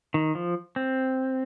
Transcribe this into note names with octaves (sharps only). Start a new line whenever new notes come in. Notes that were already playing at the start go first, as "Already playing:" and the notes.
D#3
F3
C4